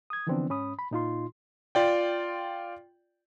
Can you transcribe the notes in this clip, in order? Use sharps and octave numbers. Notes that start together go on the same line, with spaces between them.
D#6 G#6
D3 E3 F3 B3 C4 D4
G#2 C#4 B5 D#6
B5
A#2 D#4 F4 C6
F4 D5 G5